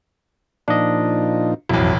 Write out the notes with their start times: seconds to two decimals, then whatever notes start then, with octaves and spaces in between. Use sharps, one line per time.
0.68 A#2 F3 D4 D#4 D#5
1.69 E1 A1 F2 F#3 E4